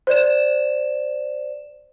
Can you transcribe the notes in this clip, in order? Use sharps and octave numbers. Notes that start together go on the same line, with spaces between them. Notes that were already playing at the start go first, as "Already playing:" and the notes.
C5 D5 E7